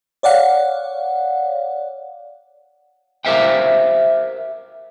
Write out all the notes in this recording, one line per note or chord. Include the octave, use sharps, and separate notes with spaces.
C#5 D5 F5 F#5
G4 A#4 C5 E5 F5 G5